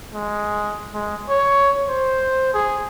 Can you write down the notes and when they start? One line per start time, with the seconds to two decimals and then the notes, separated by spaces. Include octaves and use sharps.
0.13 G#3
0.94 G#3
1.29 C#5
1.89 C5
2.54 G#4